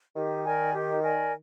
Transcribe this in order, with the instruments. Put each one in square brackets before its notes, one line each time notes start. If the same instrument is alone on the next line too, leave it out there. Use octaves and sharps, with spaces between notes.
[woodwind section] D#3 [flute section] G4
[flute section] A#4 D5 G#5
G4
A#4 D5 G#5